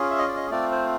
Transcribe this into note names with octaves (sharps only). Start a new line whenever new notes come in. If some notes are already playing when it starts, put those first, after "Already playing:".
Already playing: C#4 F4 G#4
E5
D#5
D5
D#5
A3 C4 F4 D5
C5